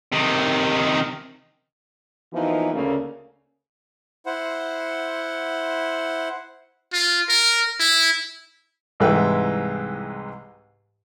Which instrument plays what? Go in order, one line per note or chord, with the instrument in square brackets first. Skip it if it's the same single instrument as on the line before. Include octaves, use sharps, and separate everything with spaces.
[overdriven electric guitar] C3 D#3
[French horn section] E3 F3 A#3 B3 D#4 F#4
D2 C#3 A3 A#3 C#4
[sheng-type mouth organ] E4 C5 F#5
[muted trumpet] F4
A#4
E4
[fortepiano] C2 G#2 E3 G#3 B4 G5